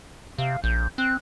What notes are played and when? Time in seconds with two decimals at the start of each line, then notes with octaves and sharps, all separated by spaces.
0.38 C3 F5
0.64 A#1 G6
0.98 C4 F#6